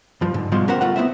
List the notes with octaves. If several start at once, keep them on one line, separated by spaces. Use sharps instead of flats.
G2 F3
D2 G#2 D3
C2 B2 F3 G3 G#3 C6
B3 C#4 G4 A#4 C5 F#5
C#2 A3 F4 F#5
B3 C4 E4 C5 E5